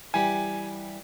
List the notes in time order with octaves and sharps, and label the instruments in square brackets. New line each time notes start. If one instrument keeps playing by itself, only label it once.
[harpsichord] E3 G3 G4 [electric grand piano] G#5